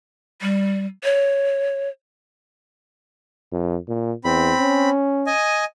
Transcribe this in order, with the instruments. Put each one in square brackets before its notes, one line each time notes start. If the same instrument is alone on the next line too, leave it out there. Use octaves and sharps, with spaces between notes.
[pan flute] G3
C#5
[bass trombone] F2
A#2
[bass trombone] E2 [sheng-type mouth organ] C4 B5
[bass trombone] C#4
[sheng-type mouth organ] D#5 G#5